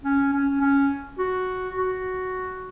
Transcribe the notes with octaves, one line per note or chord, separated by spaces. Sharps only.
C#4
C#4
C#4
F#4
F#4